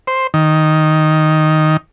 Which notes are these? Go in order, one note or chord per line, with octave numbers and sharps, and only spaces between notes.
C5
D#3